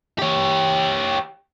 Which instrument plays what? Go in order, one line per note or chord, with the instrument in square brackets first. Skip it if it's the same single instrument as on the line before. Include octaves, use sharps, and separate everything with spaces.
[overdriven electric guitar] G4 C#5